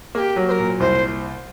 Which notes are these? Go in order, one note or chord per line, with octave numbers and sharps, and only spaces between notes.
A#3 G4 G#4
F#3
C5
A#4
A#2
C2 C5